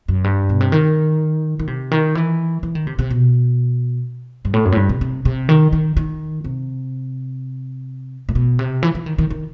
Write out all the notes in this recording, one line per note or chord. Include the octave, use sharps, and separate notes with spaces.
F#2
G2
B2
C3
D#3
D#3
C3
D#3
E3
E3
D#3
C3
C3
B2
G2
A2
F#2
A2
G2
C3
C3
C3
D#3
D#3
D#3
C3
A2
B2
C3
E3
E3
D#3
D#3
D#3